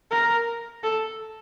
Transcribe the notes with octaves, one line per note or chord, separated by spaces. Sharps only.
A#4
A4